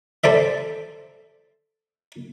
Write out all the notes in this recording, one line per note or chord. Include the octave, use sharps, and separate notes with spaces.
A4 C5 D5 E5